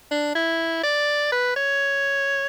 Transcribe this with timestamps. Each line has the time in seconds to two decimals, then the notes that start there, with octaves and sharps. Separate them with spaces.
0.11 D4
0.35 E4
0.84 D5
1.32 B4
1.56 C#5